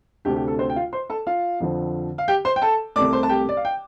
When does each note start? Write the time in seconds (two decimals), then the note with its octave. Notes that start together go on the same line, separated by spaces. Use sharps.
0.25 D2 C3 A3 C4 G4
0.36 G4
0.48 A4
0.59 C4 C5
0.70 G5
0.76 F4 F5
0.93 C5 C6
1.10 A4 A5
1.27 F4 F5
1.60 F2 D3 F3 C4
2.18 F5
2.28 G4 G5
2.45 C5 C6
2.56 G5
2.62 A4 A5
2.96 C2 C3 A3 D5 D6
3.13 C5 C6
3.23 A5
3.29 G4 G5
3.49 D5
3.57 F5
3.65 G5